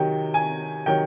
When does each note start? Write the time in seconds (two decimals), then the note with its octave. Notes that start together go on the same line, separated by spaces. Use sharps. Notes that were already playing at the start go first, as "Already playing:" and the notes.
Already playing: C3 D#3 F#3 G5
0.34 G#5
0.86 C3 D#3 F#3 G5